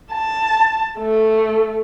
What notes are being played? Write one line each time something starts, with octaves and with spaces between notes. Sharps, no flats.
A5
A3